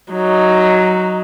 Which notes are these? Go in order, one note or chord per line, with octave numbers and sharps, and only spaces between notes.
F#3 D#4